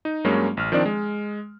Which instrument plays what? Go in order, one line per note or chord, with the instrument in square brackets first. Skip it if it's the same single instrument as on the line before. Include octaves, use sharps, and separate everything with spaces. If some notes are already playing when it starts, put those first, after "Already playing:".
[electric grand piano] D#4
G2 F#3 G#3 A#3 C#4
A1 F6
D#3 F3 C4 D4 D5
G#3